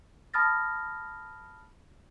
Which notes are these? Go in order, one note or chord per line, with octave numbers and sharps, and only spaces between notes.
A5 B5 D#6 F6 A6 A#6